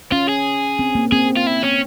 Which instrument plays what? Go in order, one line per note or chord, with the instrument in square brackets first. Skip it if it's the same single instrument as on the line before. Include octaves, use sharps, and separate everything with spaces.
[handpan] C#4 [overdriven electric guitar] F4
[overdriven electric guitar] G#4
[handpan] C4
A#3
[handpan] C4 [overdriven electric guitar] G#4
[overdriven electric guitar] F4
E4
C#4